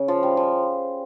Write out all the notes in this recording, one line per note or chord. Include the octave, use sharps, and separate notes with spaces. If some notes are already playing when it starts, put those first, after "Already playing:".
Already playing: C#3
F3
G3
F3